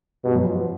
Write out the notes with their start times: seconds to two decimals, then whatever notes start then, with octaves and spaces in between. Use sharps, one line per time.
0.24 G2 B2 G3
0.35 F#2 F#3
0.44 F3
0.56 F3